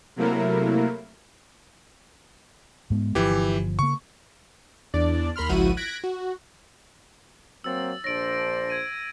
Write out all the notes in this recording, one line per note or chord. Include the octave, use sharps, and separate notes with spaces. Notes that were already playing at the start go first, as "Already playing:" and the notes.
C3 F#3 A3 A#3 E4 A#4
G#2 G#3 B3
G1 E3 F3 G4
C#3 A#3 C#6
E2 D4 D5
D#2 A#4 B5 C6 F6
G#1 C#2 F3 E4 F#4 D#7
F#6 G#6 A#6 B6 D7
F#4
F#3 A#3 C4 E6 A6
A#1 D4 C5 A#6 D7
G#6 D#7